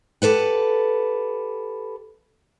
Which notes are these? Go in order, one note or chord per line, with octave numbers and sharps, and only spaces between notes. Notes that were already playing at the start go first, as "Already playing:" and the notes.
G4 A4 B4 F#5